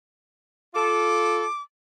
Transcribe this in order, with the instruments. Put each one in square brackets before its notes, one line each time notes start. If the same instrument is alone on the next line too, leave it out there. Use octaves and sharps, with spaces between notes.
[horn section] F4 A4 [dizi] D6